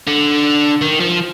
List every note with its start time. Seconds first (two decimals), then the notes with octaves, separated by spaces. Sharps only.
0.08 D3
0.81 D#3
1.00 F3